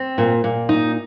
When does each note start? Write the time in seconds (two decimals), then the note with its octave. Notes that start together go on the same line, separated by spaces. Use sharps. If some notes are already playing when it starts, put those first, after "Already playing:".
Already playing: C4
0.18 A#2
0.44 A#2
0.69 D#4